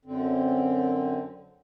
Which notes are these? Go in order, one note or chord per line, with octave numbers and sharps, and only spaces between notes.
F#2 D3 C4